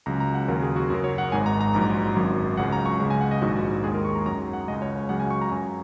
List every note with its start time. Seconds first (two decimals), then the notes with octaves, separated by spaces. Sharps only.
0.06 C#2 C#3 F#3 A#5
0.20 A#5
0.35 F#5
0.48 D#2 C#3 F#3 A#4
0.62 G#4
0.76 F#4
0.90 F#2 C#3 F#3 A#4
1.04 C#5
1.18 F#5
1.32 G#1 G#2 G#3 G#5
1.46 A#5
1.61 A#5
1.74 A#1 G#2 F#3 A#5
2.16 G#1 F#2 F#3
2.57 C#2 C#3 F#3 F#5
2.72 A#5
2.86 C#6
3.00 C#2 C#3 G#3
3.10 G#5
3.21 F#5
3.31 D#5
3.42 A#1 G#2 D#3 F#4
3.84 D#2 D#3 G#3 G#4
3.94 A#4
4.05 C#6
4.15 A#5
4.26 F#2 F#3 A#5
4.53 F#5
4.68 C#2 C#3 G#3 D#5
4.82 C#5
4.96 C#5
5.09 C#2 C#3 F#3 F#5
5.20 G#5
5.30 C#6
5.41 A#5
5.51 F#2 F#3 G#5